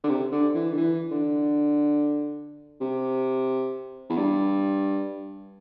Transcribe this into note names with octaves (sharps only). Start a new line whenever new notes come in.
D3
C3
D3
E3
D3
E3
D3
C3
E2
G2